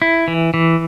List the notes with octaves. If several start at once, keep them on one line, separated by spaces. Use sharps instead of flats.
E4
E3
E3